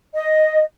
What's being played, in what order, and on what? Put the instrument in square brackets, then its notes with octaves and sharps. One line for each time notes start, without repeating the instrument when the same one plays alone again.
[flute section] D#5